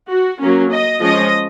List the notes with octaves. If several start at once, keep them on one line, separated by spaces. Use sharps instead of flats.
F#4
F#3 A#3 C#4
D#5
F3 G#3 C#4 D#5